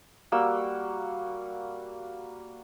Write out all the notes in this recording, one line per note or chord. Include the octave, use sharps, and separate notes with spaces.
G3 A#3 F#4 E6